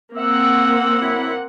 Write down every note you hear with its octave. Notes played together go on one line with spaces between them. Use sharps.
A#3 C4 F#5 E6
F#2 E4